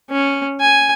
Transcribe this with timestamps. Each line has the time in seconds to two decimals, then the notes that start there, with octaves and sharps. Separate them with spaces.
0.10 C#4
0.61 G#5